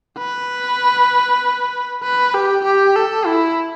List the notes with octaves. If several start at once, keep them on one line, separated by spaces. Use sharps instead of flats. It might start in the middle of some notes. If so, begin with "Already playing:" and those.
B4
B4
G4
G4
A4
E4